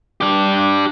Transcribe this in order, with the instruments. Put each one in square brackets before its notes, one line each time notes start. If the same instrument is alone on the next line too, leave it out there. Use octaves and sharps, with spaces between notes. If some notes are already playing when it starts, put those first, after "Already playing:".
[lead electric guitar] D4 G4